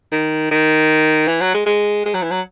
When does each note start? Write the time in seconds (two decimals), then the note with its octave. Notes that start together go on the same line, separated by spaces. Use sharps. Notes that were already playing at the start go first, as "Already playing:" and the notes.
0.12 D#3
0.51 D#3
1.27 E3
1.41 F#3
1.54 G#3
1.66 G#3
2.06 G#3
2.14 F#3
2.23 E3
2.31 F#3